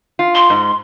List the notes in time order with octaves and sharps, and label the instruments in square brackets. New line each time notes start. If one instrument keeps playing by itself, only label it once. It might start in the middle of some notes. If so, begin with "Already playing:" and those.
[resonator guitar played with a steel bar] F4
[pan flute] C6
[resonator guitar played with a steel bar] G#2